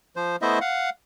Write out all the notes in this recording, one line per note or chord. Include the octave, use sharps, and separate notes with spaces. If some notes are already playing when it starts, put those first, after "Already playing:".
F3 C5
A3 B3 E4 C5 D#5 E5
F5 F#5